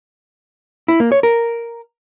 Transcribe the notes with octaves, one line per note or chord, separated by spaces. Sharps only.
E4
A#3
C#5
A#4